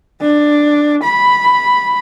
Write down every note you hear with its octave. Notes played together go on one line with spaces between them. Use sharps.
D4
B5